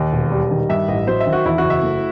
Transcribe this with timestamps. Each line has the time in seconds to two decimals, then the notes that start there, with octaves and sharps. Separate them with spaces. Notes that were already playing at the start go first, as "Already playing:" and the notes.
Already playing: D#2 D#5
0.13 E1
0.31 G3
0.51 D#3
0.69 G2 E5
0.88 A1 D#5
1.07 F#3 C5
1.20 E5
1.26 D#3
1.33 F#4
1.45 E2 E4
1.58 F#4
1.64 F#1
1.70 E5
1.83 A3